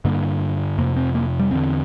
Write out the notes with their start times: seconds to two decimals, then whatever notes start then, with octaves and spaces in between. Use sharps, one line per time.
0.05 G2 D3 A#3
0.78 F2 C3 A#3
0.96 C4
1.15 A#3
1.39 G3
1.51 E2 D3 C4